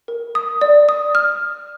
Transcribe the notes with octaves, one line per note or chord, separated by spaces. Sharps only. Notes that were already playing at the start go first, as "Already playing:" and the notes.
A#4
D#6
D5
D#6
F6